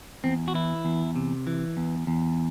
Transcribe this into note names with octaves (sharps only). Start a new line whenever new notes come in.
E2 C4
F#4
E3 E4
E2
C3
E3
E2
E2